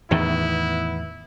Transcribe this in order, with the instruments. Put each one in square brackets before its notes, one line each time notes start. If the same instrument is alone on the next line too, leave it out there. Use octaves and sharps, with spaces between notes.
[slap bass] E2 A2 D#3 [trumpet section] B3 E4